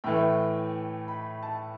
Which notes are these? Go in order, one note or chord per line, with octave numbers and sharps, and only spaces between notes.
A2 E3 A3 G5
B5
A5